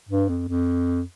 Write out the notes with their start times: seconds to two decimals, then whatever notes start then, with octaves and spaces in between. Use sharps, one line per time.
0.09 G2
0.29 F2
0.49 F2